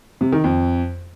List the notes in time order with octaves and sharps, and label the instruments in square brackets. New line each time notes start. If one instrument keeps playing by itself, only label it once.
[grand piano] C3
D#3
F2